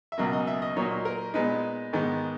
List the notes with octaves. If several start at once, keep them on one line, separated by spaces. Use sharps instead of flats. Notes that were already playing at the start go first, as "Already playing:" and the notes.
E5
C#2 B2 F#3 A#3 D#5
D#5
E5
D#5
A#2 F#3 A#3 D#4 C#5
A#4
A#2 G#3 B3 D#4 B4
G#2 D#3 G#3 B3